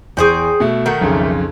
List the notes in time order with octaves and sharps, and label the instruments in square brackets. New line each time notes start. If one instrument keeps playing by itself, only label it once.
[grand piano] E2 C#6 [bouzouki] G#4 C5 G5
[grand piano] B2 A3
[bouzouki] D#3 A3 A#3 [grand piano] F#5
[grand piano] B1 F2 C#3